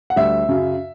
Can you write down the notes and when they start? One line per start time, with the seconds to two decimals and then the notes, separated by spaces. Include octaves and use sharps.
0.10 F#5
0.16 D2 D3 G3 E5
0.47 F#2 C#3 F#3